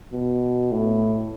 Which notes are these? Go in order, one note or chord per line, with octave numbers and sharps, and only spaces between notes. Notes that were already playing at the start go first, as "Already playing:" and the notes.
B2
A2